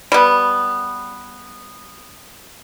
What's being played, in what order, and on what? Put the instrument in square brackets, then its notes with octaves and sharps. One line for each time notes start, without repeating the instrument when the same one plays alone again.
[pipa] G3 B3